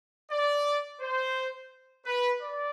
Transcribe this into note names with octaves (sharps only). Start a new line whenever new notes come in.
D5
C5
B4
D5